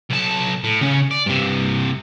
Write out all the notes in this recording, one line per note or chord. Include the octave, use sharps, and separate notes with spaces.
B1 A5
A2
C#3 C#4
D5
G2 C3